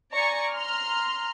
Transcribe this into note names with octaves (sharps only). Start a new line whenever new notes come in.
D5 G#5 A#5 C#6
A#5 C6 F6